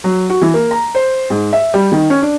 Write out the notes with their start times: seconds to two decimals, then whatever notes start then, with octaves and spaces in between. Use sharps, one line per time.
0.04 F#3
0.30 F#4
0.41 E3
0.54 A#3
0.71 A#5
0.95 C5
1.30 G#2
1.53 E5
1.74 G3
1.92 D#3
2.10 C#4
2.22 D4